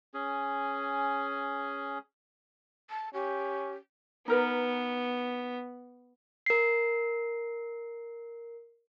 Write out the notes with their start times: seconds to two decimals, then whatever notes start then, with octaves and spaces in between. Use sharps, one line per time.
0.14 C#4 G#4
2.90 A5
3.14 C#4 G4
4.28 B3 D#4 A#4 B4
6.46 A#4 C7